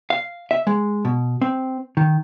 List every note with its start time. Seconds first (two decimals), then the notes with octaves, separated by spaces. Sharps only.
0.10 F5
0.51 E5
0.67 G#3
1.05 B2
1.41 C4
1.97 D#3